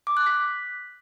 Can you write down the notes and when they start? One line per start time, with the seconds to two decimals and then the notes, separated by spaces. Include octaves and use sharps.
0.07 D6
0.17 F#6
0.26 B6